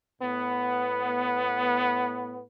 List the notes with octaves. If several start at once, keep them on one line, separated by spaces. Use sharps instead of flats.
A2 B3